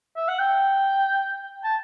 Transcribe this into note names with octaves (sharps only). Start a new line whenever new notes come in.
E5
F#5
G5
A5